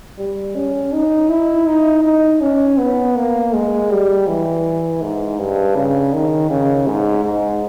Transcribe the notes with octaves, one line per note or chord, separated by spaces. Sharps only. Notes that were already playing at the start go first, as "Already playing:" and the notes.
G3
C#4
D#4
E4
D#4
D#4
C#4
B3
A#3
G#3
G3
E3
G#2
G2
C#3
D#3
C#3
G#2
G#2